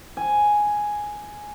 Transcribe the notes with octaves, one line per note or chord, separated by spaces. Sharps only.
G#5